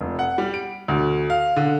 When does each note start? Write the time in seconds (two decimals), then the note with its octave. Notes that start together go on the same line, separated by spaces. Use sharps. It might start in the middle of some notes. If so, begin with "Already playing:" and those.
0.01 F1
0.19 F#5
0.38 G3
0.54 D7
0.88 D2
1.30 F5
1.56 D3